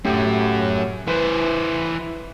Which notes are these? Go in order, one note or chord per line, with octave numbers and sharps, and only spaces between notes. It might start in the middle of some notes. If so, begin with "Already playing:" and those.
F#2 A2 F#3 G4
E3 B4 C5